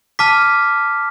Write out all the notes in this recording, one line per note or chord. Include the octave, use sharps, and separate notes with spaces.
A5 D6 F6 B6